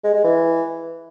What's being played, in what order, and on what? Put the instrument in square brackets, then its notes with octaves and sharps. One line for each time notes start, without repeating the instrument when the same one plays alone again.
[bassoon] G#3
G#3
E3